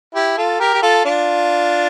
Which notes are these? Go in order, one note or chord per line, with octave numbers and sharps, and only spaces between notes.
E4 G4
F4 A4
G4 A#4
G4
F4 A4
D4 F4